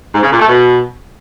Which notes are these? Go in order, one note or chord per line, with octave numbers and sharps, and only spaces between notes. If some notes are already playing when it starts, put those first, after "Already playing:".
G#2
C#3
A#2
A3
B2